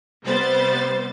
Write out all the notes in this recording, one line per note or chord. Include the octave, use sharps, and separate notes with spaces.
C3 G3 B3 C5 A6